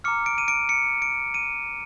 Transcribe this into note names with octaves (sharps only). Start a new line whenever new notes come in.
A#5 D6 F6 C#7
D7
D#7
D7
C#7
D7
D#7